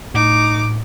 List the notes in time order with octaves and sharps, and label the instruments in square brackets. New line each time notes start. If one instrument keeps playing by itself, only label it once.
[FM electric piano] A2 [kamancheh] D#4 D6